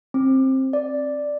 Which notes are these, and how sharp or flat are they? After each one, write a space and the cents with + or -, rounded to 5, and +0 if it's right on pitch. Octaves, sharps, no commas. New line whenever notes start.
C4 +20
D5 +0